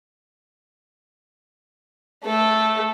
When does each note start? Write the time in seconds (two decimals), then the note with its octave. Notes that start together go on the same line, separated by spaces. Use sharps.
2.25 A3 A4